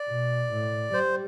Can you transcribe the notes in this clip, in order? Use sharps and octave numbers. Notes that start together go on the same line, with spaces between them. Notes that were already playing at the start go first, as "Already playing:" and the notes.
Already playing: D5
B2
A2
G3 C5